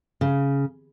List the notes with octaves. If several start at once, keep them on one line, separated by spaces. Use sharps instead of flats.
C#3